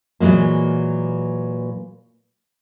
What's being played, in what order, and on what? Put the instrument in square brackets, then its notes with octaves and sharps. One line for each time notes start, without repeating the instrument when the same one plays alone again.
[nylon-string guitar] A#2 E3 F#3 G#3 A#3